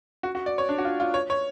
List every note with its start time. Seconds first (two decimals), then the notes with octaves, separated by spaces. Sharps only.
0.23 F#4
0.35 F#4
0.46 D5
0.58 C#5
0.69 D4
0.78 F#4
0.85 F4
1.00 F4
1.14 C#5
1.30 C#5